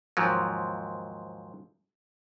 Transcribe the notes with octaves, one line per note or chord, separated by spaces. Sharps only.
D#2 G#2 F3 F#3